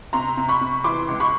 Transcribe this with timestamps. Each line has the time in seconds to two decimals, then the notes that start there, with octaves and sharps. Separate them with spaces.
0.13 C3 A#5 C6
0.37 C3
0.49 B5 C#6
0.61 C3
0.84 E3 C6 D6
1.08 C#2
1.20 B5 C#6